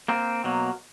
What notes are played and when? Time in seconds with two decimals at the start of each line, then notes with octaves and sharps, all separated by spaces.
0.08 A#3 C4
0.44 B2 F#3 A#3